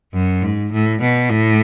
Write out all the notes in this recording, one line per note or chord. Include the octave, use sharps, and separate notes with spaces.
F#2
G#2
A2
B2
A2